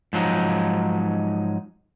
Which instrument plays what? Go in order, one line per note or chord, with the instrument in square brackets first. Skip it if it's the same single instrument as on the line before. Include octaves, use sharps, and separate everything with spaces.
[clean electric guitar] G#2 F3 F#3 D#4